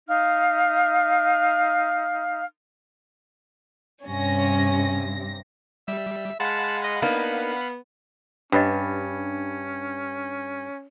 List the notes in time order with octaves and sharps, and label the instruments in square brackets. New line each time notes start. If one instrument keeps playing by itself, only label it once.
[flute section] D#4 F5 F6
[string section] G2 C3 A#6 [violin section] C#4
[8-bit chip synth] G3 [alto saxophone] E5
[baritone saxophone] G#3 [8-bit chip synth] F5 F#5 B5 [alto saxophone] A5
[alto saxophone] D#5
[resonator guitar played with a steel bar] A#3 D#4 [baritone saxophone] B3 [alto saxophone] D4
[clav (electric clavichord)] G2 [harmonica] C#4 [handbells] D4 B5 A6 [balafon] B4 C#5 D#5